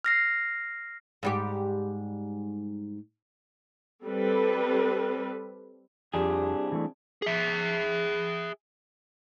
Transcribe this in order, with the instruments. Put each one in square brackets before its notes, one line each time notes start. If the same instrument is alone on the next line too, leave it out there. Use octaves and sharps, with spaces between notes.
[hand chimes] F6 A#6 C7
[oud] G#2 G3 G4
[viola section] G3 C4 A4 B4
[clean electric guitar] C2 D4 G#4 [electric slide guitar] F2 F3 [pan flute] G4
[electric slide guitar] E3 A3
[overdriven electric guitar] G#4 E5